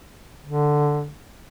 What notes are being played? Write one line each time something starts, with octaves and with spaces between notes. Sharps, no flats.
D3